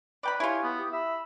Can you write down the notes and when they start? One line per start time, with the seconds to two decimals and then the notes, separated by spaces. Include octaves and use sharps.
0.23 B4 D5 G5 B5
0.40 E4 F4 G4 C#5 G#5
0.63 B3
0.78 G4 D#6
0.92 E5 B5